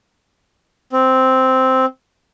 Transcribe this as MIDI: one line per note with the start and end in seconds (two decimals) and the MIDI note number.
0.93 1.85 60